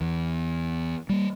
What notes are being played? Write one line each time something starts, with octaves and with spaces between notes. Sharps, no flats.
E2
G3 A#3